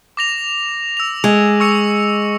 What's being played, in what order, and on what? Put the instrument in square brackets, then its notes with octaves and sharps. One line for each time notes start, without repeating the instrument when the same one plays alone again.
[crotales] D6 A#6 F7
E6 F7
[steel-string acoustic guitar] G#3
[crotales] C#6 E6 C#7